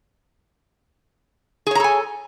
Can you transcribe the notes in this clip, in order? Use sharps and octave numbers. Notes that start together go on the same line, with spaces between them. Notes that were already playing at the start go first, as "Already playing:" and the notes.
G#4 A4 C#5 G#5 A#5